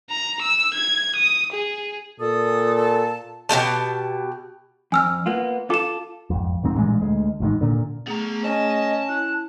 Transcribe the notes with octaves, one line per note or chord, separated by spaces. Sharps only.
A#5
E6
G#6
D#6
G#4
A#2 A4 D#6
A5
B2 D4 G4 A5
F2 G#5 E6 F6
A#3 B3 F4
F4 A4 D6 E7
G#1 F2
D#1 G#2 D#3 C4
A1 G2 A#2 G#3
D2 G#3
A1 G#2 D#3
A#2 D3
A3 B3 G#4 A#5
C#4 D#5 A5
E4 F#6